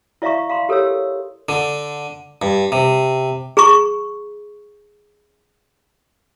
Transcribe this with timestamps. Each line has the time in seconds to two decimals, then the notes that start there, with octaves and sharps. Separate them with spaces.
0.22 E4 D5 E5 F5 A#5 C#6
0.49 F5 A#5 C6
0.69 G4 A4 A#4 C#5 E6
1.49 D3
2.42 G2
2.72 C3
3.57 G#4 A#5 C#6